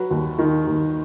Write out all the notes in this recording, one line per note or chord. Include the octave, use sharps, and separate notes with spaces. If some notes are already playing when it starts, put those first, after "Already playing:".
Already playing: F#3 B4
D#2
D#3
D#2